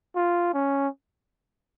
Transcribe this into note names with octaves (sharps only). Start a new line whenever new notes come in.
F4
C#4